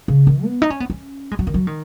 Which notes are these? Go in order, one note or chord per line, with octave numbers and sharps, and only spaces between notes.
C#3
D#3
B3
D#4
C#4
B3
C#4
G#3
F#3
D#3
F#3
D#3